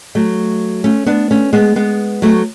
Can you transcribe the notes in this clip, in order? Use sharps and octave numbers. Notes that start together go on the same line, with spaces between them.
F#3 A3
A3 C#4
B3 D4
A3 C#4
G#3 B3
G#3 B3
F#3 A3